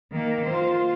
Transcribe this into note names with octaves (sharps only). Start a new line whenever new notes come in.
D#3 A#3
F4 C5